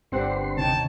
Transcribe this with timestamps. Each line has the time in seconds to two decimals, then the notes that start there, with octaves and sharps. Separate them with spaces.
0.12 G1 C4 D4 G4 B4 F#5 C6
0.57 D#2 C3 D#4 C#5 G5 A5